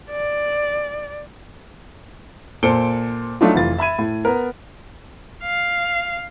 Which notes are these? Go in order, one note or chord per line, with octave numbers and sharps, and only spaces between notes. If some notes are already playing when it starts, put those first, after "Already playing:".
D5
A#2 A4 C5 C#7 D7 G7
F#3 A3 D4 D#4 F4
F1 E3 F4 A6
E5 B5 G#6 D#7
A2
B3 A#4
F5